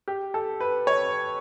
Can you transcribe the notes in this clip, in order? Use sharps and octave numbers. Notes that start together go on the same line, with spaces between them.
G4
A4
B4
C#5